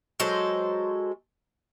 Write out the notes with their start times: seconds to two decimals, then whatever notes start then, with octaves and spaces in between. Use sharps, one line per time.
0.20 F#3 G#3 A4 C5